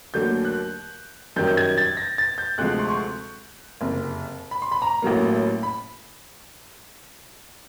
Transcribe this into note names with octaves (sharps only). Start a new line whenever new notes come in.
D#2 D3 F#3 A3 G6
F#6
F#2 D#3 G3 G6
G6
G#6
A6
A#6
A6
G6
D2 C3 F3 G#3 F#6
C6
C#6
F#1 F2 C3
B5
C6
B5
A#5
A1 A2 F#3 A#3
B5